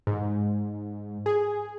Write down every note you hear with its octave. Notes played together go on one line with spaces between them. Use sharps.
G#2
G#4